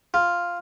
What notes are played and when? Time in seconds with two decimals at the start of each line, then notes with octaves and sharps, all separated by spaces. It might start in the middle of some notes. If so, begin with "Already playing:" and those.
0.14 F4